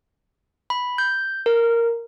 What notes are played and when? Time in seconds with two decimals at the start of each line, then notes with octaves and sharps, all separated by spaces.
0.70 B5
0.98 G6
1.46 A#4